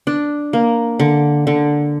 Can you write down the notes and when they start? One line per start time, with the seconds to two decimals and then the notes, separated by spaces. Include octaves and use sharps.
0.07 D4
0.53 A#3
0.99 D3
1.47 D3